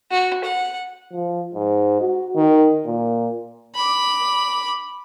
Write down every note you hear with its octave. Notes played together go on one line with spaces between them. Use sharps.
F#4
F#5
F3
G#2
F#4
D#3
A#2
B5 D6